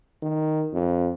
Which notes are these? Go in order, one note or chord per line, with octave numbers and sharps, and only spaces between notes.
D#3
F2